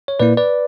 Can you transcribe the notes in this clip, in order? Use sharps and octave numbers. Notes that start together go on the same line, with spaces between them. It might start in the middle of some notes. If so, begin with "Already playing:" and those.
C#5
A#2 A#3 E4 B4 D5
B4 D5